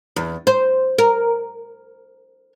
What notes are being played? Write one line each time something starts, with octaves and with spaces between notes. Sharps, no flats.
E2
C5
A#4